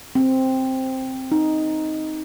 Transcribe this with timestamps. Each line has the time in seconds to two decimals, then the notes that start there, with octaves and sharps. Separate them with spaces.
0.15 C4
1.32 D#4